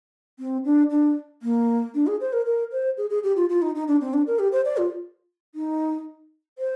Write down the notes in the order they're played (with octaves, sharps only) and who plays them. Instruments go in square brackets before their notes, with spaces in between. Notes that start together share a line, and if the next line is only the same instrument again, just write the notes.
[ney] C4
D4
D4
A#3
D4
G#4
C5
A#4
A#4
C5
G#4
G#4
G4
F4
F4
D#4
D#4
D4
C4
D4
A#4
G4
C5
D5
F4
D#4
C5